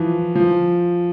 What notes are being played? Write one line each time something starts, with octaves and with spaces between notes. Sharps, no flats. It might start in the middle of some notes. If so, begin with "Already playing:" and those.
Already playing: E3 F3
F3